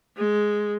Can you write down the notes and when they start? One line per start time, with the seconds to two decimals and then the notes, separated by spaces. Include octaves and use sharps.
0.17 G#3